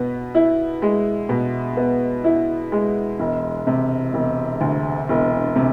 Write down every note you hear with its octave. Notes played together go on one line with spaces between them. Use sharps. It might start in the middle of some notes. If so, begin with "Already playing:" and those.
Already playing: B2 B3
E4
G#3
B2
B3
E4
G#3
E1
C3
E1
D2
E1
C3